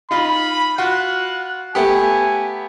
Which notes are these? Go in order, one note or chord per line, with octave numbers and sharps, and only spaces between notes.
D#4 F4 B5
F4 F#4 F5 F#6
A3 B3 G4 G#5